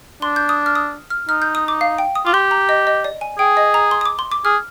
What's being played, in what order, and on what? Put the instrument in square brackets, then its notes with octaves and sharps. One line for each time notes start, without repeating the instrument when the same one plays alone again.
[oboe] D4 [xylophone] C6
[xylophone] G6
D#6
F6
D#6
F6
[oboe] D#4 [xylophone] F6
[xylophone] G6
D#6
D6
F5
G5
D#6
[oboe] F4 [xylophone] D6
[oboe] G4 [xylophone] C6
[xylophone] A#5
D#5
D#5
D5
G#5
[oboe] G#4 [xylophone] G5
[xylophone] D#5
A#5
C6
D#6
D6
C6
D6
[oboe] G#4 [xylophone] F6